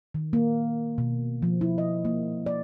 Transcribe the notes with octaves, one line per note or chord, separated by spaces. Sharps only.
D#3
A#3
B2
F3
E4
D#5
A#3
D5